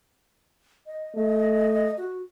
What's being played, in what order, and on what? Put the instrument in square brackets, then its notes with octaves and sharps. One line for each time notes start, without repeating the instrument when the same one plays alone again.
[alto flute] D#5
[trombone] A3 [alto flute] D#5
[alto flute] F#4